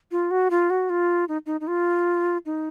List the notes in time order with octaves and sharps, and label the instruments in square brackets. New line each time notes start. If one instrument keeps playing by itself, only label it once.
[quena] F4
F#4
F4
F#4
F4
D#4
D#4
D#4
F4
D#4